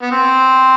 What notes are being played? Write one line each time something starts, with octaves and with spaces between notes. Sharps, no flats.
B3
C4